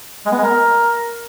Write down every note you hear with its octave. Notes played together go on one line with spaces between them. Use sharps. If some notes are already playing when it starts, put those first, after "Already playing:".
G#3
B3
G#3
A#4